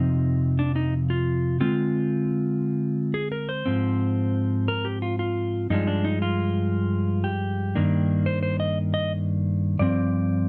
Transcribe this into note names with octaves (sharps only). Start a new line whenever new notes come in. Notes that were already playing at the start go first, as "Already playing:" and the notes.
Already playing: F2 C3 F3 C4 D#4
D4
D#4
F4
D3 G#3 C4 F4
G#4
A#4
C5
G#2 F3 C4
A#4
G4
F4
F4
G2 F3 G#3 D4 D#4
D4
D#4
F4
G4
G2 D#3 A#3 D4
C5
C5
D#5
D#5
G2 F3 C4 D5